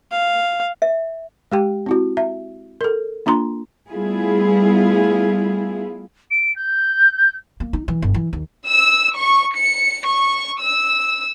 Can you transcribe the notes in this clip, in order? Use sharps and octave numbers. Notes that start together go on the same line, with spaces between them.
F5
E5
G#3 G4 G5
C4 E4 F#4
E5
A4 A#4
A#3 D4 F4 A#5 C6
G3 A3 B3 E4 F4 G#4
D7
G6
A#3
D#4
E3
G1
E3
D#2
E6
C#6
C#7
C#6
E6